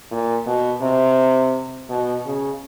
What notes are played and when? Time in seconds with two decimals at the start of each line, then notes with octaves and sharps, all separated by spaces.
0.11 A#2
0.47 B2
0.82 C3
1.89 B2
2.25 C#3